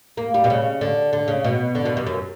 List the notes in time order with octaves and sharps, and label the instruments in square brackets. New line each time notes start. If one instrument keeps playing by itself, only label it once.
[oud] A#3
G3
B2
C#3
D3
D3
C#3
B2
D3
B2
G2
F#2